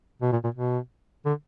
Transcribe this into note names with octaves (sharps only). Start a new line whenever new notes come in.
B2
A#2
A#2
B2
D3